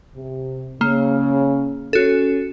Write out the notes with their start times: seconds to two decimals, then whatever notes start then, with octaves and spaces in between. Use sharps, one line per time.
0.14 C3
0.81 C#3 A#3
1.93 C#4 F#4 A4